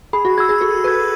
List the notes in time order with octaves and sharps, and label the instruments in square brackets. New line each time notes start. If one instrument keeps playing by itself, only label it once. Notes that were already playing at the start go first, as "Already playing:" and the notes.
[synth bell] G#4 [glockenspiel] B5
[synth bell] F#4
[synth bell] G#4 [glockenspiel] G#6
[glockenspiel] E6
[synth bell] G#4
[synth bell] F#4 A4 [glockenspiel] B5
[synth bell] G#4 B4 [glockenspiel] E6 G#6